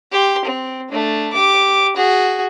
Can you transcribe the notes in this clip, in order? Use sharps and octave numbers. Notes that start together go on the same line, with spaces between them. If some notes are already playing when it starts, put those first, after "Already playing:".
G4 C6
C4
A3 D4
G4 D6
F#4 G#4